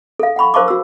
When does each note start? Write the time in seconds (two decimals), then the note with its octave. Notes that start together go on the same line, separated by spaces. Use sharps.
0.20 A4 F5
0.36 F#5 G5 B5 C#6
0.54 A#4 C5 F5 A5 C#6 D6
0.68 F#4 E6